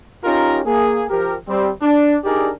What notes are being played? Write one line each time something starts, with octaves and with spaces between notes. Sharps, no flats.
C#4 D#4 F4 G4 A#4
A#3 G#4
F3 G4 A#4
G3 C4
D4
D4 D#4 G4 G#4 A#4 D5